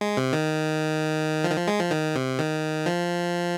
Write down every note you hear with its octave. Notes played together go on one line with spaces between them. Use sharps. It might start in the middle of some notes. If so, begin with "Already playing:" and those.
G#3
C3
D#3
F3
D#3
F3
G#3
F3
D#3
C3
D#3
F3